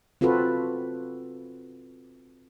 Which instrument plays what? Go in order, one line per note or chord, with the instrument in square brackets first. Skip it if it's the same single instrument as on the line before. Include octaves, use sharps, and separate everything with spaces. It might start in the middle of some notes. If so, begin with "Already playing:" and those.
[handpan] C4 F4 F#4 A4 B4